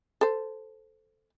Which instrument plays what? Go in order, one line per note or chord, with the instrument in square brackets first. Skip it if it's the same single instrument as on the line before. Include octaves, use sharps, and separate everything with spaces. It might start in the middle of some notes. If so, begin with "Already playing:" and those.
[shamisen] A4 C5